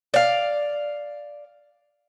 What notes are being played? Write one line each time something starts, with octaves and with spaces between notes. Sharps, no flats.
D5 F5